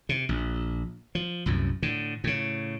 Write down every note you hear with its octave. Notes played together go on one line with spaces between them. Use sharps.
C3
A#1
F3
C2 F#2 A2
A2 D3
A2 C#3